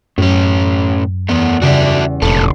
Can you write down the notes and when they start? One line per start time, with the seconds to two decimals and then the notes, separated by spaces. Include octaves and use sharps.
0.18 F#2 A2 C#4
1.29 E2 A3 B3
1.62 C#3 G3 F#4 D5 E5
2.22 F1 A#2 A4 C7